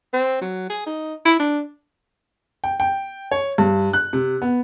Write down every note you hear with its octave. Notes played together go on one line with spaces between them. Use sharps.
C4
F#3
G#4
D#4
E4
D4
G5
G5
C#5
G2
F#6
C3
B3